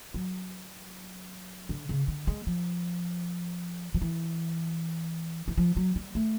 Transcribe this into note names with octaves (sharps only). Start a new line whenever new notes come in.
F#3
D3
C#3
D3
G#3
F3
F3
E3
E3
F3
F#3
G3
A3